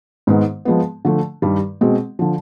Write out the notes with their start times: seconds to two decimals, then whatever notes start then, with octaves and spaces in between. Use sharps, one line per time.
0.27 G#2 D#3 G#3 B3
0.65 F3 G#3 B3
1.05 D3 F3 A3
1.42 G2 D#3 G3
1.81 B2 G#3 C4
2.19 D3 F3